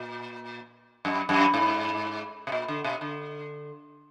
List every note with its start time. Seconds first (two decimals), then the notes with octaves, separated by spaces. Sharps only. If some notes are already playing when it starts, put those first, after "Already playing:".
Already playing: A#2
1.05 F#2
1.29 F#2
1.54 G#2
2.47 B2
2.52 A#2
2.68 D3
2.84 B2
3.01 D3